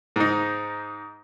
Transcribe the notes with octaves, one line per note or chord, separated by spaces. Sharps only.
G#2 D#4